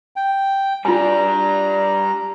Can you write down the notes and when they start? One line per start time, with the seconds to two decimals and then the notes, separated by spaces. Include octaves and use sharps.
0.16 G5
0.85 G3 D4 F4 G#5 A#5